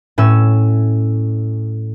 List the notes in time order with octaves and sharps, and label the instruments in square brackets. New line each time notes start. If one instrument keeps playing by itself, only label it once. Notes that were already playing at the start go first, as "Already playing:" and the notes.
[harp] A2 C#4 E6